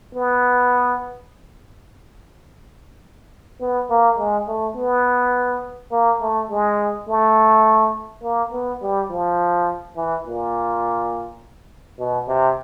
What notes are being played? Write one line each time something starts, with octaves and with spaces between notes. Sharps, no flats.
B3
B3
A#3
G#3
A3
B3
A#3
A3
G#3
A3
A#3
B3
G3
F3
E3
A#2
B2
C3